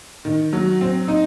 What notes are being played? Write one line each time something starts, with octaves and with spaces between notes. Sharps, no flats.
D#3
F#3
C4
D#4